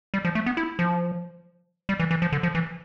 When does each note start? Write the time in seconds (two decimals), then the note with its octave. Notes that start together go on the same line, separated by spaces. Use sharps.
0.14 G3
0.25 F3
0.35 A3
0.46 B3
0.57 E4
0.79 F3
1.89 G3
2.00 E3
2.11 E3
2.22 F3
2.32 D3
2.43 F3
2.55 E3